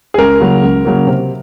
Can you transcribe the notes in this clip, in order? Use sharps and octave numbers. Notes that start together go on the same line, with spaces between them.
G#4
C#2 A#4
C#3 F#3 A#3
C#2
C#3 F#3 A#3
C3